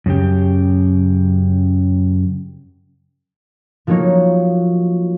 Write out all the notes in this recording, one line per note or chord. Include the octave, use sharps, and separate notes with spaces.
F#2 C#3 G4
F3 F#3 A#3 D#4 C#5